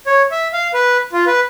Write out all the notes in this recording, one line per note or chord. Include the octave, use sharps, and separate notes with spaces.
C#5
E5
F5
B4
F4
B4